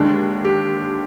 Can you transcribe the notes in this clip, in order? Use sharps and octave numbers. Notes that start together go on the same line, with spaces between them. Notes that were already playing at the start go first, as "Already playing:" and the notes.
Already playing: D#2 D3 G#3 D4
G4